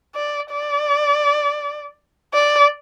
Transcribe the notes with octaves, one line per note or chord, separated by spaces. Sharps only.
D5
D5
D5